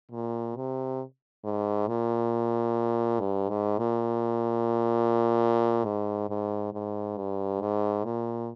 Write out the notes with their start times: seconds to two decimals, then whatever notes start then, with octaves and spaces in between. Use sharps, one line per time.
0.11 A#2
0.56 C3
1.44 G#2
1.87 A#2
3.20 G2
3.49 G#2
3.78 A#2
5.85 G#2
6.29 G#2
6.73 G#2
7.17 G2
7.61 G#2
8.04 A#2